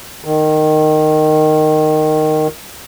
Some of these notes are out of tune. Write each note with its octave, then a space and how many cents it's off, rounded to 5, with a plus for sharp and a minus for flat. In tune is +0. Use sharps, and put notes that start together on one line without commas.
D#3 -10